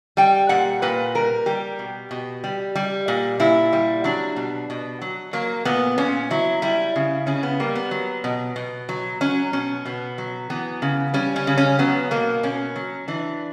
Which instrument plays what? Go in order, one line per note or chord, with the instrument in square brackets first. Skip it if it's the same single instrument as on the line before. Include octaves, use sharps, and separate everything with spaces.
[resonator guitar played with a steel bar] G3 G5
A#2 F#5
A#2 B4
G3 A#4
G3 G4
B2
B2
G3
G3
A#2
A#2 E4
G3
F#3 D4
B2
B2
F#3
F#3 A#3
A#2 B3
A#2 C#4
F#3 E4
G3 E4
C#3
C#3 C#4
B3
G3 A#3
B3
F#3
B2
B2
F#3
F#3 C#4
B2 C#4
B2 B3
F#3
E3 B3
C#3
G3 C#4
C#4
C#3
C#4
F#3 B3
B2 A#3
B2 C#4
F#3
E3 D4